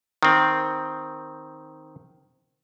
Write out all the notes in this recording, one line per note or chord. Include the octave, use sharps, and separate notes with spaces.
D#3 C4